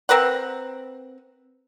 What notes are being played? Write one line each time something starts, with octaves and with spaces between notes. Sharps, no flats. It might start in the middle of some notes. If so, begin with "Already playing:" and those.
C4 A#4 B4 F#5